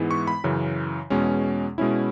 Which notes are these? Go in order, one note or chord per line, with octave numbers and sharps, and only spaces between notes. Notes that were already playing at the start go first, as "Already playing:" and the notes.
Already playing: G#2 E3 G#3 B3 E4
C#6
B5
F#2 C#3 E3
E2 B2 G#3 C#4
B2 G#3 C#4 E4